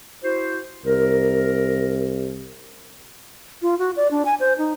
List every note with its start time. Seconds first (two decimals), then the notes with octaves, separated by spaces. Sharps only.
0.23 E4 F#4 C5
0.86 C2 A#4
3.62 F4
3.79 F#4
3.96 D5
4.11 D4
4.25 G#5
4.40 C5
4.58 D#4